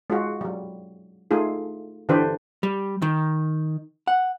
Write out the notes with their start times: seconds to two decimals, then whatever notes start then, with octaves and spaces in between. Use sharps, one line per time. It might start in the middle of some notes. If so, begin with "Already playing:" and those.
0.10 G#3 F4 F#4
0.41 F#3 G3
1.31 A3 D#4 F4 G#4
2.09 D3 E3 D4 G4 B4 C5
2.63 G3
3.02 D#3
4.07 F#5